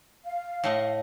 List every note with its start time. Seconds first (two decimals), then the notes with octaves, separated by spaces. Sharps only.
0.24 F5
0.64 A2 A3 D#5